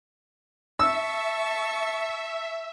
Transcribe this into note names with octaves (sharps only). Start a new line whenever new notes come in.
E5 A5 C#6 E6